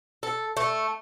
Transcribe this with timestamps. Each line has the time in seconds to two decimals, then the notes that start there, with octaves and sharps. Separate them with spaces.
0.23 A4
0.57 A3